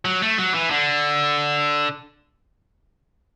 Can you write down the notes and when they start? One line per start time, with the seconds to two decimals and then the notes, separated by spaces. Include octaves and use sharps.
0.05 F#3
0.22 A3
0.38 F#3
0.54 E3
0.71 D3